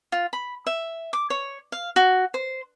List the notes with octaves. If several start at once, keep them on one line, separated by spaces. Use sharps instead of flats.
F4
B5
E5
D6
C#5
F5
F#4
C5